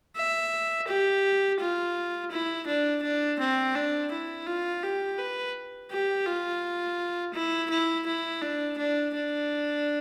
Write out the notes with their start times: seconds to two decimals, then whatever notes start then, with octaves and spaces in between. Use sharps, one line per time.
0.16 E5
0.88 G4
1.60 F4
2.32 E4
2.67 D4
3.03 D4
3.39 C4
3.75 D4
4.11 E4
4.47 F4
4.83 G4
5.18 B4
5.91 G4
6.27 F4
7.34 E4
7.70 E4
8.06 E4
8.42 D4
8.78 D4
9.14 D4